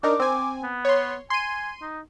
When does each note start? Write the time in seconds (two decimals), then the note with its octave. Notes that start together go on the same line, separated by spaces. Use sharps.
0.03 D4 D#4 A#4 D6
0.20 C4 G#5
0.63 B3
0.85 C#5 C6
1.30 G#5 C6 D#7
1.82 D#4